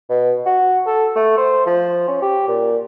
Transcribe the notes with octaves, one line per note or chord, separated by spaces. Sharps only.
B2
F#4
A4
A3
C5
F3
C#4
G4
A#2